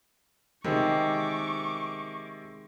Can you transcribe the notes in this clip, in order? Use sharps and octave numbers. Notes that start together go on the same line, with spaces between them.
C3 D#3 G#3 C#6 D6